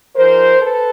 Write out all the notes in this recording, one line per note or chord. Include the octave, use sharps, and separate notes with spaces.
G#2 F3 G#3 A#4 C5
A4 B4